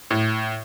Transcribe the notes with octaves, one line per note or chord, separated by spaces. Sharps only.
A2